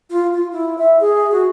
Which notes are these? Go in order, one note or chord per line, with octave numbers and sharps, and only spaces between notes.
F4
F4
E4
E5
G#4
F#4